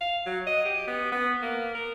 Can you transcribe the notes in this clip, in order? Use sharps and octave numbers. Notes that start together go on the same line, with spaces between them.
F5
F#3
D#5
G4
B3
B3
A#3
A#4